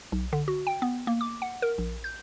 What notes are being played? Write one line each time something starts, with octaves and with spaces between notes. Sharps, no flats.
B1
D3
F#4
G5
B3
A#3
D6
F#5
A#4
A#1
G6